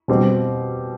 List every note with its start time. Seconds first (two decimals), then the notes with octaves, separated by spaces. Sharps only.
0.08 B2 G3 C4 G4